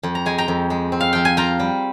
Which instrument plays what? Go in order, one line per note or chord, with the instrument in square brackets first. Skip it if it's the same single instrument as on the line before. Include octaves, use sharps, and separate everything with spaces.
[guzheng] F2
A#5
G#3 G#5
G5 A#5
F2
G#3
C4
F5
F3 G5
G#5
F4 G5 A#5
G3